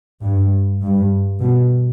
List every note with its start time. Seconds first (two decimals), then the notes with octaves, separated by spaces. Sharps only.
0.22 G2
0.82 G2
1.41 B2